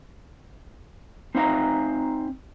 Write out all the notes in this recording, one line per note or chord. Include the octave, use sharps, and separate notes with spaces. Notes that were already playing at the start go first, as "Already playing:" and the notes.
C4 D#4 E5 F5 A#5